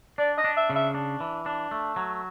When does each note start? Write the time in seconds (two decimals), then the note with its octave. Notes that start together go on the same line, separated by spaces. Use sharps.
0.18 D4 D5
0.38 D#5
0.44 D4
0.57 E5
0.70 C#3
0.75 E5
0.95 D4
1.20 E3
1.46 D4
1.71 A3
1.96 F#3